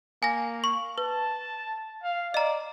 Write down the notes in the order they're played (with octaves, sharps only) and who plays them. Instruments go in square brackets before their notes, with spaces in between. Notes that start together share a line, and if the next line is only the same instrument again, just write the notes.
[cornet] A#3 [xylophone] G#5 A#6
[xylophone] C#6
[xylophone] B4 [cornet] A5
[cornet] F5
[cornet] D5 [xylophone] D#5 A#5